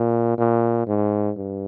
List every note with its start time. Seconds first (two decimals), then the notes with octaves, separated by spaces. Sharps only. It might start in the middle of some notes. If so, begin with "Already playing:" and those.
Already playing: A#2
0.38 A#2
0.87 G#2
1.38 G2